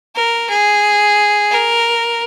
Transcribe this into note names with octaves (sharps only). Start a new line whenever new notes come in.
A#4
G#4
A#4